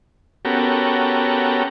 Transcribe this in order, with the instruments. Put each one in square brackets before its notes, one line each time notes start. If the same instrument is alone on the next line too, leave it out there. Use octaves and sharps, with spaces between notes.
[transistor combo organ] B3 C#4 F#4 G4 A4 A#4